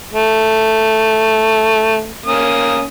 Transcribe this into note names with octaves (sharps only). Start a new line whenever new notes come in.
A3
A#3 C#4 D#6